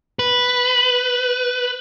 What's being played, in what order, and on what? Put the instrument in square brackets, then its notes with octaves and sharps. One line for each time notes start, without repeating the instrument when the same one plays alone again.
[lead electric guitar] B4